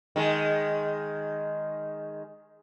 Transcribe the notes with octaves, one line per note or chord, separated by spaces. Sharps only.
D#3 G#3